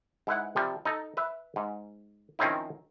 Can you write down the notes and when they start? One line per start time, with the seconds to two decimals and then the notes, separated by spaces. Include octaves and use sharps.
0.27 G#2 E4 B4 F#5
0.56 C3 F3 G3
0.85 D#4 A4
1.17 B4 E5
1.56 G#2
2.39 D#3 F3 C4 C#4 D#4 E4